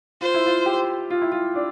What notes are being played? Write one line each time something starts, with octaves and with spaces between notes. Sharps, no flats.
F4 C5
E4
F4
G4
F4
E4
F4
D4